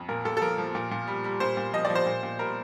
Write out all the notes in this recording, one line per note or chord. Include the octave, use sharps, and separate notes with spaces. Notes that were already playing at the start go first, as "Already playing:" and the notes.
Already playing: F2
A#2 A#4
A#2 A4
A4
F3 A#4
F3
A#2
A#2
G3
G3
A#2 C5
A#2
F3 D#5
D5
F3
C5
A#2
A#2
G3 A#4